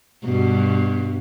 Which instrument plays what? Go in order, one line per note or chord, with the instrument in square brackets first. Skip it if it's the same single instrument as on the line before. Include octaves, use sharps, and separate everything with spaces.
[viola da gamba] G2 B2